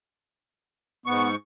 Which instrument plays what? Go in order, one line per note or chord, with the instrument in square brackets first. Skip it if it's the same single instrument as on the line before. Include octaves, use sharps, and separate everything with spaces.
[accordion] G#2 C#6 [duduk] B3